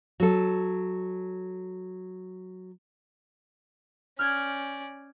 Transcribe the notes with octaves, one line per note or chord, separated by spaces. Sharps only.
F#3 A4
C#4 D5 F6 G6 G#6